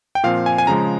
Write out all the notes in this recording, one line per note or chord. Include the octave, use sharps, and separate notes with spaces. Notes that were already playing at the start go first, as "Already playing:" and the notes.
G5
A#2 F3 C4 F5
G#5
G#5
C#3 F3 G#3 A#5